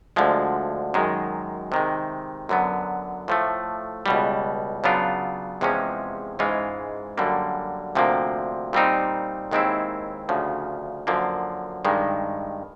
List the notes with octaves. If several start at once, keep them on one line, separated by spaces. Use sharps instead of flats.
D2 D3 F3 G#3
F#2 D#3 G#3
C3 D#3 G#3
F#2 D3 F#3 B3
A2 F3 A3
C#2 B2 G3
C#3 F#3 B3 D4 F4
E2 C3 F3 G#3 C#4
G#2 E3 G#3 C#4 F4
F#2 D3 G3 A#3
D2 C3 F3 A#3
A#2 G3 C4 D#4
D#2 D#3 G#3 C4 E4
D2 C#3 F3
F#2 D3 F3 A#3
G2 D#3 G#3